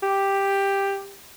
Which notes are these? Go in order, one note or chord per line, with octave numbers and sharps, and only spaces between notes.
G4